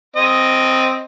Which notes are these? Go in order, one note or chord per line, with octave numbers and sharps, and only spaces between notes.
C4 D#5